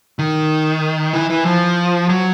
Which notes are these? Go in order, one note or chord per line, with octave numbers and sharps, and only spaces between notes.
D#3
E3
E3
F3
F#3